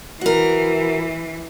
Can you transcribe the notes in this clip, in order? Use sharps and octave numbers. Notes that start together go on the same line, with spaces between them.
E3 F#4 A#4